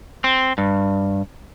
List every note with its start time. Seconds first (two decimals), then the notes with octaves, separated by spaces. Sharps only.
0.24 C4
0.58 G2